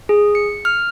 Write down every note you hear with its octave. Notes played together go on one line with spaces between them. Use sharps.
G#4
C#7
F6